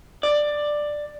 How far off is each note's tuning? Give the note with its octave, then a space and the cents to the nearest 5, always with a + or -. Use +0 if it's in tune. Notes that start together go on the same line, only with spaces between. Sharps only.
D5 +10